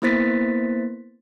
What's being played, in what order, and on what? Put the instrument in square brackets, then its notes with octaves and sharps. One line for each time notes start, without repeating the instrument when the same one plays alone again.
[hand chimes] A#3 B3 E4 C5 A6 B6